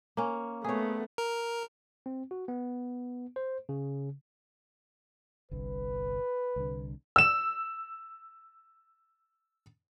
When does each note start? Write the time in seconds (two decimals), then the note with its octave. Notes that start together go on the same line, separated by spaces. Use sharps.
0.17 A#3 C#4
0.64 A3 B3 G#4 C#5
1.18 A#4
2.06 C4
2.31 F#4
2.48 B3
3.36 C5
3.69 C#3
5.51 G1 C2 G2 B4
6.56 C2 D3
7.16 E6 E7